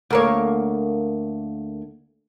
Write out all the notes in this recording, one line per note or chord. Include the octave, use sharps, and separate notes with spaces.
D2 A#3 C#5